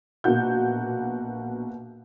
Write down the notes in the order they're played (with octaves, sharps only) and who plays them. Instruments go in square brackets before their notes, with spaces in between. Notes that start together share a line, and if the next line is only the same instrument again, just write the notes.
[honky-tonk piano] A#1 B2 A#3 F#4 G6